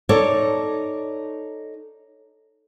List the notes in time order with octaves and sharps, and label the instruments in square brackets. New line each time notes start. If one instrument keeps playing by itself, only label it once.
[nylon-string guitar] D#4 A4 C#5 D5